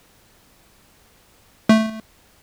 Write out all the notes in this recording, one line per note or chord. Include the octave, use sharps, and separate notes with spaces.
A3